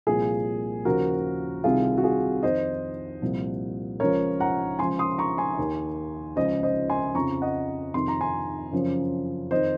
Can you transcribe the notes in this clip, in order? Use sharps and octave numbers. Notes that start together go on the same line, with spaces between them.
C2 A#2 F3 F4 G#4
D#2 C#3 F3 F#4 A#4
C2 C3 D#3 F4 G#4
F#4
F4 G#4
F2 D#3 C5 D#5
C2 A#2 F3
C#2 C#3 F3 A#4 C#5
F#5 A#5
C#2 C#3 F3 G#5 C6
C6 D#6
A#5 C#6
G#5 C6
D#2 D#3
C#2 C#3 F3 C5 D#5
C5 D#5
G#5 C6
F2 C#3 F3 A#5 C#6
D#5 F#5
F2 C3 D#3 C6
A#5
G#5 C6
F#2 C#3 F3
F2 D#3 C5 D#5